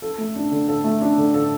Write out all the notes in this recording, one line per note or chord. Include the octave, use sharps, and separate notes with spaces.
A4
A3
D4
D3
A4
A3
D4
D3
A4